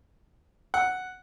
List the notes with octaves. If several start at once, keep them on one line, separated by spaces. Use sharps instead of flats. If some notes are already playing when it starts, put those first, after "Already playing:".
F#5